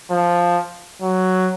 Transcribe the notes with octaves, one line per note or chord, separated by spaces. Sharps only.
F3
F#3